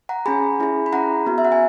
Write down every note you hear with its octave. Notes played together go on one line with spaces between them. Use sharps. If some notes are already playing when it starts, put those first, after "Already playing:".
F#5 A#5
C#4 G#4 G#5 B5
C#4 E4 G#4
B5
C#4 E4 G#4 F#5 A#5
B3 F#4
E5
F#5
G#5